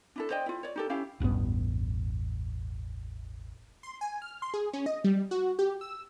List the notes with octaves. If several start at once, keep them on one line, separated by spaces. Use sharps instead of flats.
D4 E4 A4
C5 D5 D#5 G5
E4 F4
C#5 D5
D#4 G4 A4
C#4 E4 G4 F5
E1 A1 G2 B3
C6
G#5
F6
C6
G#4
C#4
D#5
G3
F#4
G4
E6